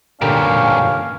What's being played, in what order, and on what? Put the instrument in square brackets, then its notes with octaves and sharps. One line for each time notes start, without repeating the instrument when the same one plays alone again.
[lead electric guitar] G2 A#2 [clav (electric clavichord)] D3 G4 A#4 [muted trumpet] C#4 [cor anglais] F5